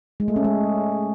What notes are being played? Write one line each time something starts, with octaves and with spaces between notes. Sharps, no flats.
G#3
A3
C#4
G#3